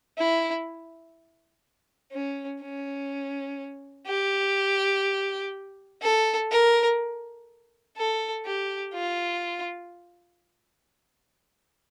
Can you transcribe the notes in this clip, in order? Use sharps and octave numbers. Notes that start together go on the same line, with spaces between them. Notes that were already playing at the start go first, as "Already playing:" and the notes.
E4
C#4
C#4
G4
A4
A#4
A4
G4
F4